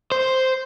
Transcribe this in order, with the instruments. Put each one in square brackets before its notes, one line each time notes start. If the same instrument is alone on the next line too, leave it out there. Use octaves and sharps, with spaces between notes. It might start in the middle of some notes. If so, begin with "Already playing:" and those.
[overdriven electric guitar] C5